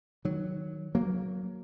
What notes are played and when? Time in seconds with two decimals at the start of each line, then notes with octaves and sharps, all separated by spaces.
0.25 D#3 F#3
0.95 F#3 A#3